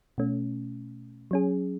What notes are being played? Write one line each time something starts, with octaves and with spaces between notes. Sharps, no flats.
B2 A3 C#4
F#3 C#4 G#4